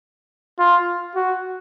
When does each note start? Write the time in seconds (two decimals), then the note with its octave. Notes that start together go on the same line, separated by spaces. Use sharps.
0.59 F4
1.16 F#4